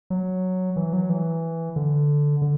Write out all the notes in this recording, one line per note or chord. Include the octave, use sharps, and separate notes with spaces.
F#3
E3
F#3
E3
D3
D3